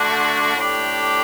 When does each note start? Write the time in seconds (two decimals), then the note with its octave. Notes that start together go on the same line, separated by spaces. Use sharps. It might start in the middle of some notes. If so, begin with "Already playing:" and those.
Already playing: D3 A3 D4 F#4
0.56 A2 A3 D4 G4